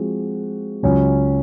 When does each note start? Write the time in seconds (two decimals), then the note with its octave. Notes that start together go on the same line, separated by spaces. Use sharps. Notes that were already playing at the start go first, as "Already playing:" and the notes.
Already playing: F3 G#3 C4 F#4
0.83 C#2 C#3 F#3 C#4